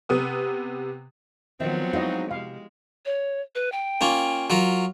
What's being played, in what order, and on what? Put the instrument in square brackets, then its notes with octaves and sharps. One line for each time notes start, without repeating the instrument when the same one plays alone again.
[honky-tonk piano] C3 B3 D#6
[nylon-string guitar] D#3 E5 [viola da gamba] F3 F#3 B3 [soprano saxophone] C4
[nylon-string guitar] G#3 D#4 F5 [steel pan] E4 F#4 D#5
[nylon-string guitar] C3 [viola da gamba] G#3 [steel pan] F5
[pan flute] C#5
B4
G5
[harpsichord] A#3 C#4 F4
F#3 F4 A#4